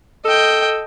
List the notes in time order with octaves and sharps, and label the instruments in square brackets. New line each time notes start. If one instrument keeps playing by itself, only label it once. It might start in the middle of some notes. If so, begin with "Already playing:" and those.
[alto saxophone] A4 [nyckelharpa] D#5 G5